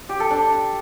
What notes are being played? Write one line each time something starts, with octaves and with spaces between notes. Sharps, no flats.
G4
A4
D4